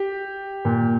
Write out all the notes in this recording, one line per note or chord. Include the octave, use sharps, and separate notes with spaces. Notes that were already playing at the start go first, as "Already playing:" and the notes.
Already playing: G4
A#2